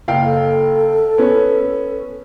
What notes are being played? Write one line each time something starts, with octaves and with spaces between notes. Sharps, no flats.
F#1 F5 G5
A4
B3 C#4